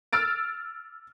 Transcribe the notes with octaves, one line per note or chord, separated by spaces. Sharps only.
E6 F6 A6 D7